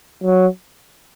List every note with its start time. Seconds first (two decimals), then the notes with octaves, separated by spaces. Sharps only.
0.24 F#3